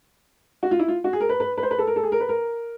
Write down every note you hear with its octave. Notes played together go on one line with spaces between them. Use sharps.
F#4
F4
E4
F4
F#4
G#4
A#4
B4
B4
B4
C5
B4
A4
A#4
A4
G#4
A#4
B4
A#4